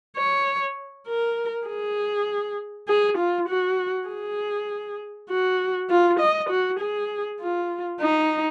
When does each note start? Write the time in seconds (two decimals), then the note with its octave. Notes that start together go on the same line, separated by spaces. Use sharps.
0.17 C#5
1.07 A#4
1.68 G#4
2.88 G#4
3.18 F4
3.48 F#4
4.08 G#4
5.29 F#4
5.90 F4
6.20 D#5
6.50 F#4
6.80 G#4
7.40 F4
8.01 D#4